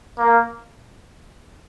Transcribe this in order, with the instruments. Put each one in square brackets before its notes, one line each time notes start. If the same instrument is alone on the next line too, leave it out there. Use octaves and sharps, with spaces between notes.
[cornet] A#3